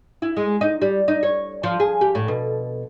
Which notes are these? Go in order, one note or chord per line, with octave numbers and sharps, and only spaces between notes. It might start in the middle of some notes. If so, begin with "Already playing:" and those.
E4
G#3
D#4
G3
D#4
C#5
F3
G#4
G4
A2
B2